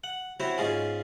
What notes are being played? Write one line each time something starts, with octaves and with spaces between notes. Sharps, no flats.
F#5
C4 E4 F#4 C#5
G#2 C#4 F4 G#4